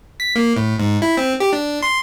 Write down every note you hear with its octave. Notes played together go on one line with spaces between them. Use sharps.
B6
A#3
A2
G#2
E4
C4
G4
D4
C6